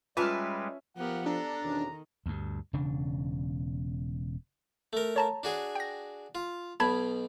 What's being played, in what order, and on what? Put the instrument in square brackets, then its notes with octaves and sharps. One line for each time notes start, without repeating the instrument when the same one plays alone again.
[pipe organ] G3 G#3 [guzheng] C#4 E5 A5 [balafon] F4 [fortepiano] B4 F6
[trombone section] F3 [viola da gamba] B3 G4 A#4 [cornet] F#5
[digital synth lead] D4 [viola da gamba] A4 [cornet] A#5
[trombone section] E2 B2 C#4 [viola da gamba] D#3
[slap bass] D2 G2
E1 C#3 D4
[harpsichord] A3 A#4
[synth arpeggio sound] C#5 A5 A#5
[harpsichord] D4 F#4 G#4
[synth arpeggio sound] G5 A#6
[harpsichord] F4
[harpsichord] B1 B2 [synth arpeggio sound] A5 B5 G#6